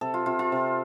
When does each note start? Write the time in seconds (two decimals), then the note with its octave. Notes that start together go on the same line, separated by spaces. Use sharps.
0.01 C3 A4
0.14 F4
0.26 C3 F4
0.39 F4
0.52 C3